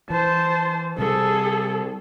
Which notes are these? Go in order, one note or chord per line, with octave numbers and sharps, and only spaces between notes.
E3 C5 A5
C3 G3 G#4 A4